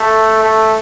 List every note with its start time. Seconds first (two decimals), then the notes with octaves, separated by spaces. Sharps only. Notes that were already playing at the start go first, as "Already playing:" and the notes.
Already playing: A3
0.43 A3